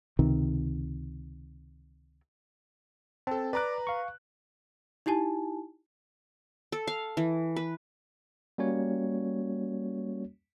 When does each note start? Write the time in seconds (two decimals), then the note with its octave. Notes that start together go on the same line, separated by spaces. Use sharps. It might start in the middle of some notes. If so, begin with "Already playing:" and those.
0.19 C#2 C3 D#3
3.27 C4 A4 A5
3.53 B4 D5 A#5 D6 F#6
3.87 F5 C#6
5.06 D#4 E4 G4 G#5 A5
6.72 A4
6.87 F5
7.17 E3
7.56 B4
8.58 G3 A#3 C#4 F#4 C#5